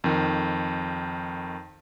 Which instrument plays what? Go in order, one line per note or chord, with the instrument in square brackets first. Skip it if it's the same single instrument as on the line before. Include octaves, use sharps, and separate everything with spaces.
[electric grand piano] F2 D#3